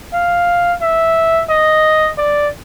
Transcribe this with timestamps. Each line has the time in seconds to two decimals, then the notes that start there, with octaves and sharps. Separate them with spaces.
0.13 F5
0.81 E5
1.49 D#5
2.17 D5